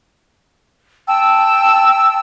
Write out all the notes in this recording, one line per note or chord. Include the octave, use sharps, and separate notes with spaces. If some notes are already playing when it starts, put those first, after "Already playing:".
G5 A5 E6